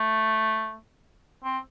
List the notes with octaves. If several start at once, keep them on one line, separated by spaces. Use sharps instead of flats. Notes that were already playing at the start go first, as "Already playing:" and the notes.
Already playing: A3
C4